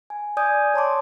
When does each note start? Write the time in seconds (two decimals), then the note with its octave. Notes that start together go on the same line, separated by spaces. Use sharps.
0.10 G#5
0.37 D5 G#5 D#6 G6 G#6
0.74 C#5 A5 C6 D6